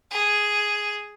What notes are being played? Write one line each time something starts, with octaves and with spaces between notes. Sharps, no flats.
G#4